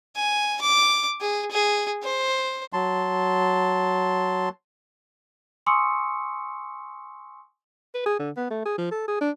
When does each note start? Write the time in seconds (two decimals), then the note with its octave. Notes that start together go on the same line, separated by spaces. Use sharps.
0.16 G#5
0.61 D6
1.21 G#4
1.51 G#4
2.03 C5
2.73 F#3 A5 C6
5.66 G#5 C6 C#6 D#6 E6 C#7
7.95 B4
8.06 G#4
8.19 D3
8.37 B3
8.50 A3
8.66 G#4
8.78 F3
8.91 A4
9.08 G#4
9.21 D4